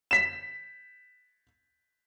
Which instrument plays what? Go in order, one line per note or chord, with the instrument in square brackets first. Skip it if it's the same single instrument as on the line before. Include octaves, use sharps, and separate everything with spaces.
[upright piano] B6 E7